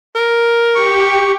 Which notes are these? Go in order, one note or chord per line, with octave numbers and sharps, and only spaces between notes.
A#4
G4 C#6